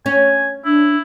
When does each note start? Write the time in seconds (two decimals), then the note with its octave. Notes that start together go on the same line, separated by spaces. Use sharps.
0.06 C#4 G#5
0.65 D4 E4